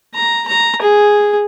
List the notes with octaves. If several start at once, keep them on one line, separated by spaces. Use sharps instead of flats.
A#5
A#5
G#4